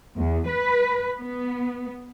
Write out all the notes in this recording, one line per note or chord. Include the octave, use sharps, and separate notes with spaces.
E2
B4
B3